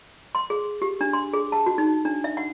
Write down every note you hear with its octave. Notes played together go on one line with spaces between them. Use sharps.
C6
G#4
G4
D4
C6
G#4
A5
F#4
D#4
D4
E5
F#5